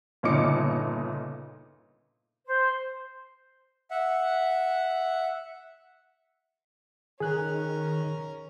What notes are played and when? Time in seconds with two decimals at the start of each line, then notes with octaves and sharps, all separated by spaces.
0.23 G1 A#2 C#3 D#4 D6 C#7
2.47 C5
3.91 E5 F#5
7.20 D#3 C#4 G#4 A#4 F#6